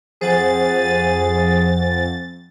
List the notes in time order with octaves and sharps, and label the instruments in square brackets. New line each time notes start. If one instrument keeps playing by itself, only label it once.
[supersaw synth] F2 A6 [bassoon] G#4 [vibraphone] C5 F#5 G#5